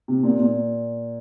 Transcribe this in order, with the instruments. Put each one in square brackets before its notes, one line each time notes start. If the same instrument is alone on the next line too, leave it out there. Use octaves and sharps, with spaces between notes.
[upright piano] C3
A#2
A#2